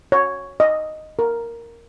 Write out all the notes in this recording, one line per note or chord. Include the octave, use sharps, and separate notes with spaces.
C#5
D#5
A#4